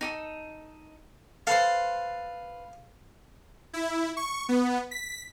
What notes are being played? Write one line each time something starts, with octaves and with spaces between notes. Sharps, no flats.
D#4 G4 A4
A4 B4 C5 F5
E4
C#6
B3
B6